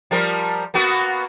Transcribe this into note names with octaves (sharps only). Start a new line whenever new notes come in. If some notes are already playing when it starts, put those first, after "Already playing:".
F3 G3 A#4
A#3 B3 F#4